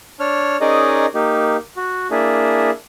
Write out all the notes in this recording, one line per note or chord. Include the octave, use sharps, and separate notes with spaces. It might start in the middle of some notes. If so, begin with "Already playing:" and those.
D4 C#5 F6
C#4 D#4 G#4 A#4 D5 D#5
A#3 D#4 G4
F#4
A#3 D4 E4 G#4